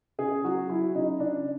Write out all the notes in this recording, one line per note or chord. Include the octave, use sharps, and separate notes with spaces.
C#3 G#4
F#3 F#4
F#3 E4
C#3 D#4
C#3 D4